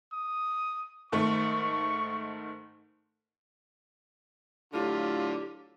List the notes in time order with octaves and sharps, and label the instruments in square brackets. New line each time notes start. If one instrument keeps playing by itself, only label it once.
[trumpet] D#6
[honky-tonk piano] G#2 D#3 A3 [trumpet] C#6
[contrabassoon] A2 [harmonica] D3 [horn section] F#3 D4 F4 [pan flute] G4